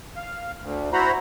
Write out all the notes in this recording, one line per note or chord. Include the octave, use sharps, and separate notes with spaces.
F5
D2
E4 F#4 C5 A#5 B5